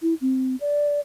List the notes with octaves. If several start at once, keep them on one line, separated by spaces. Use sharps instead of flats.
E4
C4
D5